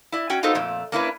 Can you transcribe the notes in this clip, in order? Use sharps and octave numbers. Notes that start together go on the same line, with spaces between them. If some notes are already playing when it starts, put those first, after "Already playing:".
E4 D5
C#4 F#4 G5
B3 D#4 F4 F#4 A4 C5
F2 A#2 A3
A#3 C#4 D4 E4 A4 B4